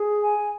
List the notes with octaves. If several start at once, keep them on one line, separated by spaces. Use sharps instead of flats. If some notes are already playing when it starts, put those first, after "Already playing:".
Already playing: G#4
G#5